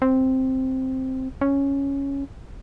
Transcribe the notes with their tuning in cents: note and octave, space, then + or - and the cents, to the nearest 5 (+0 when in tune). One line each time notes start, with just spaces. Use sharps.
C4 +0
C#4 +0